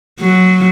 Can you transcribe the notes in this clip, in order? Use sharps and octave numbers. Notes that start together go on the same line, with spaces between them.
F#3